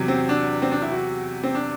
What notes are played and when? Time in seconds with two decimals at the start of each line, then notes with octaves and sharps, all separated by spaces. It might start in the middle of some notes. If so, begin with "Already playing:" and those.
Already playing: E2 C3 F#3
0.08 C4
0.29 D4
0.62 C4
0.71 D4
0.82 E4
0.92 F#4
1.44 C4
1.55 D4